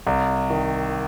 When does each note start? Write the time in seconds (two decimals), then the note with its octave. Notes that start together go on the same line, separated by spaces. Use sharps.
0.07 C2
0.50 D#3